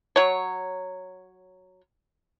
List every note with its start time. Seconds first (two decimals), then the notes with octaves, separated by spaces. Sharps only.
0.16 F#3 C#5